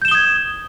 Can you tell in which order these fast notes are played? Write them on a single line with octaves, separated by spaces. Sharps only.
G6 E7 G7 D#6 G#6